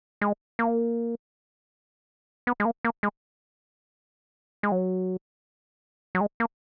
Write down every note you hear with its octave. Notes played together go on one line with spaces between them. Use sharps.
G#3
A#3
B3
G#3
A#3
A#3
G#3
G#3
F#3
F#3
G#3
A#3